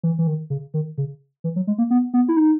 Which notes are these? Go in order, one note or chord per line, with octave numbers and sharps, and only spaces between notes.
E3
E3
D#3
C#3
D#3
C#3
E3
F#3
G#3
A#3
B3
B3
E4
D#4